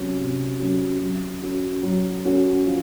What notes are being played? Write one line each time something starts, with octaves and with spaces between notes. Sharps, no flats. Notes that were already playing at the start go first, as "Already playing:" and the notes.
Already playing: C3 F#3 C#4 F#4
C3
F#3 C#4 F#4
F#3
C#4 F#4
F#3
C#4 F#4
F3